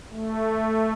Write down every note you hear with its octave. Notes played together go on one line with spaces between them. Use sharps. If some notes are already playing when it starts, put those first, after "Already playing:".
A3